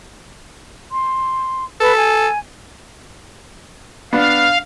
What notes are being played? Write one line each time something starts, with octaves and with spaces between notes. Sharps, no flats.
C6
A4 B4
G#5
B3 D4 F5